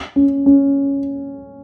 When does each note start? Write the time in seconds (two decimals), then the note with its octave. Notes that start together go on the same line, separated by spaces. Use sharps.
0.16 C#4
0.46 C#4